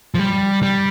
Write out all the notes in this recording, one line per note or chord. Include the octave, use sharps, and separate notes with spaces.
F3
G3
G3